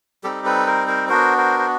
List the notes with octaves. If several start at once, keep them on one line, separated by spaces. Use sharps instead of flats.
G3 C4 D#4 G4 A4
A4 B4
A#4 C5
A#4 C5
B3 D4 F#4 A#4 C5
A#4 C5
C5